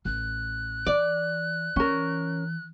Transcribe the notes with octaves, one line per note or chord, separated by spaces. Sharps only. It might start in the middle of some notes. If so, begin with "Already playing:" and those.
A1 F#6
E3 D5
E3 C#4 A#4